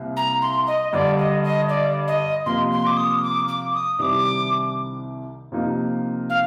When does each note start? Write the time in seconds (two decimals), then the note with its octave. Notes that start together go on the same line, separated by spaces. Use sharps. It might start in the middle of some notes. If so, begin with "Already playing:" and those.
Already playing: C2 C3 A#3
0.16 A#5
0.42 C6
0.67 D#5
0.93 G2 D3 G3 D5
1.18 D#5
1.44 D#5
1.69 D5
2.07 D#5
2.46 C3 F3 A#3 F4 C6
2.71 C6
2.87 D6
2.97 D#6
3.22 D6
3.48 D6
3.73 D#6
3.99 C2 C3 D#3 G3 D4 D6 D#6
5.52 C3 F3 A#3 D#4
6.29 F5